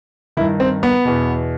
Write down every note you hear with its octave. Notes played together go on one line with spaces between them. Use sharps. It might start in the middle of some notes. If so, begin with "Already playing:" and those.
G2 D#3 E4
C4
B3
E2 B2